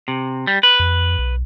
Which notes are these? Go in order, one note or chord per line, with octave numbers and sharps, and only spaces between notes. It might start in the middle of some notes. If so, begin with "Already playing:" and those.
C3
G3
B4
F2
B1